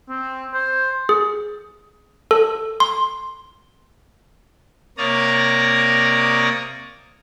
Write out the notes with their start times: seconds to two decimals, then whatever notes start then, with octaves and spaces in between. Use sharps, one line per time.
0.08 C4
0.53 C5
1.09 G#4
2.31 A4
2.80 C6
4.98 C3 A#3 C#5 D5 A#5 D#6